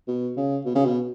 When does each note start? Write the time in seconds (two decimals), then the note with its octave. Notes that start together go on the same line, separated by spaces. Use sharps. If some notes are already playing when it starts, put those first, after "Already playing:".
0.08 B2
0.37 C#3
0.65 B2
0.75 C#3
0.85 B2